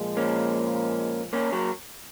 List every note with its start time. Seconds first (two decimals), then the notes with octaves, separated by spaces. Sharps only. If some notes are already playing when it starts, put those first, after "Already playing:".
Already playing: A#2 F3 G#3
0.17 A#3 C#4
1.33 A#3 C#4
1.52 F#3 A#3